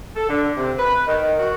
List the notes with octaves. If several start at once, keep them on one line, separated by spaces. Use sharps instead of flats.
A4
D3
C3
B4
D#3
F#4